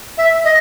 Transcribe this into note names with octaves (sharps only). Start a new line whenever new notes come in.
E5
D#5